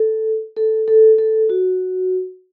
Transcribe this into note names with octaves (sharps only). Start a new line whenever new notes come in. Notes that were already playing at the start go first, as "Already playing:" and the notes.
Already playing: A4
A4
A4
A4
F#4